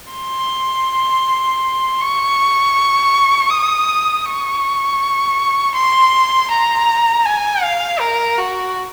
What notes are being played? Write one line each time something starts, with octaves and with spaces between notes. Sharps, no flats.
C6
C#6
D#6
C#6
C6
A#5
G#5
F5
A#4
F#4